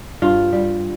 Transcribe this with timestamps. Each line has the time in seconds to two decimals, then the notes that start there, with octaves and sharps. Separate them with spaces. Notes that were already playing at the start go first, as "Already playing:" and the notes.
0.22 G2 F4
0.53 G3